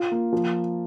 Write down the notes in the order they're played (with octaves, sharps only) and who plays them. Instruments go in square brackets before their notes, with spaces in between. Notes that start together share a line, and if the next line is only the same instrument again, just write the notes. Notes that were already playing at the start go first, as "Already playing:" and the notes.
Already playing: [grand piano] F4
A#3
F3